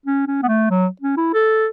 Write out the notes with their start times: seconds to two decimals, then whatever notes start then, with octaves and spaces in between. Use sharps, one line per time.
0.06 C#4
0.27 C#4
0.43 B3
0.48 A3
0.70 F#3
1.01 C#4
1.17 E4
1.34 A4